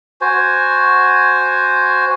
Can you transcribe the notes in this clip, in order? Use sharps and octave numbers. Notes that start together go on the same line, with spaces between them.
F#4 C5 G#5